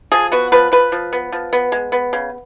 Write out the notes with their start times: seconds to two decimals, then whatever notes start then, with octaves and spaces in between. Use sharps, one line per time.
0.12 F3 G#4
0.32 B3 F#4
0.52 F3 B4
0.72 F3 B4
0.92 F3
1.13 B3
1.32 F3
1.53 B3
1.72 G#3
1.92 B3
2.13 C#3